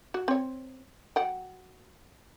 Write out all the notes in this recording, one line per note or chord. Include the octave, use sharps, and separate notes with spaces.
F#4
C4 C#5
F#3 F#5 G5